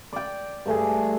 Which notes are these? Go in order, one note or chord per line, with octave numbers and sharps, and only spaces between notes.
D5 G5
G2 A3 G#4